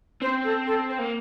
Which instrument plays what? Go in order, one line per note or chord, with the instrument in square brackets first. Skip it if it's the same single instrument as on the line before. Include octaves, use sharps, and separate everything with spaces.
[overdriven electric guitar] C4 [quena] C5
[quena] A4
A4
C5
[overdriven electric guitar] A#3